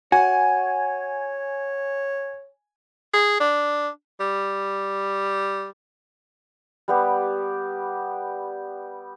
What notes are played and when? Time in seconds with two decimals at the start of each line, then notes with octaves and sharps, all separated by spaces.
0.12 F#4 C#5 G#5
3.14 G#4
3.40 D4
4.20 G3
6.88 G3 B3 G4